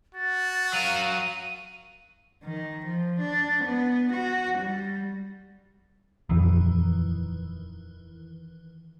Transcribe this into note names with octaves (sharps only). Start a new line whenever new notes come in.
F#4 A6
F#3 A#4 F5 D#7
D#3
F3
D4
B3
F#4
G3
D#1 F2 D#3 E3